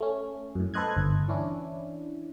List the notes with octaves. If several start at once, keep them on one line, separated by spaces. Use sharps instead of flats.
A3 C#4
F#2 A2
A4 B4 C5 D#5 F#6 G#6
G1 D2
E3 C#4 D4 E4